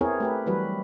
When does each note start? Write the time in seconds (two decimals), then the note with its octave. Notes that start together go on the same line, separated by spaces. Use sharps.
0.01 B3 C4 E4 G#4 A#4 C#5
0.20 A3 G4 B4
0.46 E3 F#3 G3 F#4 B4